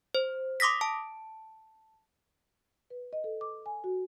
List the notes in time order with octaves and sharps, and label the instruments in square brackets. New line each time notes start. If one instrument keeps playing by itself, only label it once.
[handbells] C5
C6 D6 D#6 A#6 B6
A5
[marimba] B4
D#5
A4
D6
G#5
F#4